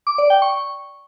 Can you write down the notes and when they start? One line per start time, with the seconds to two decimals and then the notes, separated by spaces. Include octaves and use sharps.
0.07 D6
0.18 D5
0.30 G5
0.42 C#6